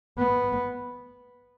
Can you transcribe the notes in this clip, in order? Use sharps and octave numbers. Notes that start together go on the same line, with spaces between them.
B3